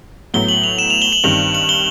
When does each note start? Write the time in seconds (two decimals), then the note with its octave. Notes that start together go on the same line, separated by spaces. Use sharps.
0.34 A2 F#3 B3 G7
0.49 F#7
0.64 F7
0.79 E7
0.90 F7
1.02 G7
1.12 F#7
1.24 G2 D#3 G3 C4 F7
1.55 F#7
1.69 G7